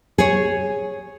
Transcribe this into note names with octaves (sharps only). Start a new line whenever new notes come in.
G#4 C#5